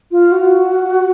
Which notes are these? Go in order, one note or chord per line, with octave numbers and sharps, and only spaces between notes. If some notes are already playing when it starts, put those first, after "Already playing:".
F4
F#4